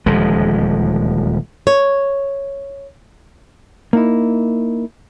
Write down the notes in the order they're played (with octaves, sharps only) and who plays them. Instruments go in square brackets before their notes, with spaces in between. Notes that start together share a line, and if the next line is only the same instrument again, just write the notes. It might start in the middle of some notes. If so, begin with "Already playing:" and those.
[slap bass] D#1 D2 F3 G#3
[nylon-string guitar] C#5
[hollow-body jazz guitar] A#3 D#4 E4